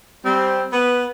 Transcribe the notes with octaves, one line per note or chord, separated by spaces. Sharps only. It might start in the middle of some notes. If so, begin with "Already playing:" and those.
G3 C4
B3 B4